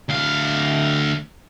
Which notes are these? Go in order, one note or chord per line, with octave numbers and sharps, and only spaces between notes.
D2 F5